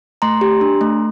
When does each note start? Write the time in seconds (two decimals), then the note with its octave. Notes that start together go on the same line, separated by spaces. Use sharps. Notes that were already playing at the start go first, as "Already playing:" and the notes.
0.22 A3 A#5 C6
0.41 G4
0.61 D4
0.81 A3